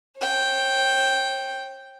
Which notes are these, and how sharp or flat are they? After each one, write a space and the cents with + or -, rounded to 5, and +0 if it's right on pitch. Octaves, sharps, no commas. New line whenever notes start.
C#5 -45 G5 +0